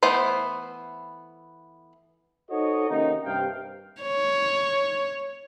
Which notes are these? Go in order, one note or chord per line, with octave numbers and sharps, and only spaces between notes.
E3 A3 B3 C5
D#4 F#4 A4 C5 C#5 D#5
D#2 C3 A#3 C#4 D#4
G2 C3 F5 G5
C#5